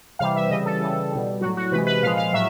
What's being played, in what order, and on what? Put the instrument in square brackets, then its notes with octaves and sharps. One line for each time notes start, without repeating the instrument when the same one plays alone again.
[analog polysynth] C3 E3 G3 F5
E5
C#3 E3 G3 D#5
A4
C#3 E3 G3 A4
B2 G3
A2 F#3 F#4
F#4
C3 E3 G#3 B4
B4
A#2 F3 G#3 F5
F5
A2 F#3 E5